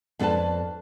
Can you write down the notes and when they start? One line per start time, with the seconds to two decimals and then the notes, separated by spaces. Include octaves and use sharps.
0.19 F2 B3 D4 F#4 B4 A5